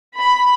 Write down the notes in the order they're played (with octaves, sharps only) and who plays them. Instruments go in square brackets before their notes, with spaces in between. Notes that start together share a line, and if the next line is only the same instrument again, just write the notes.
[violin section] B5